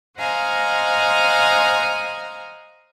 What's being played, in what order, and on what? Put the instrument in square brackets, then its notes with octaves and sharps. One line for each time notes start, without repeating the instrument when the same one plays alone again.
[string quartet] C5 D#5 F5 F#5 G#5 A#5